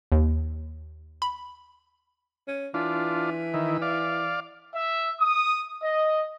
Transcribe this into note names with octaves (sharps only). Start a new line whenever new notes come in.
D#2
B5
C#4
E3 D4 F4
D#3 E4
D5 F5
E5
D#6
D#5